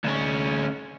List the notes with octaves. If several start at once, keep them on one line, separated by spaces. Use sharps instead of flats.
D2 C#4